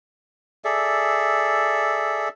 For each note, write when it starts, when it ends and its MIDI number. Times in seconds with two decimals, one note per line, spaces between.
0.64 2.29 68
0.64 2.29 69
0.64 2.29 74
0.64 2.29 76